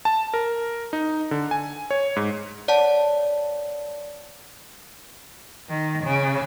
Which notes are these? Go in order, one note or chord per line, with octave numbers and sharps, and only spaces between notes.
A5
A#4
D#4
D3
G#5
C#5
G#2
C#5 D5 F#5 A5
D#3
C#3